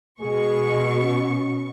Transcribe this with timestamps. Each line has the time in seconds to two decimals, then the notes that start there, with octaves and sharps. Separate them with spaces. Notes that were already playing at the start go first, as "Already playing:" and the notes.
0.20 B2 G#3 G#4 C#6
0.99 C#4